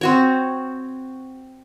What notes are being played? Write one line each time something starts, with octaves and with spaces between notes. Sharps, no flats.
C4 F#4 C#5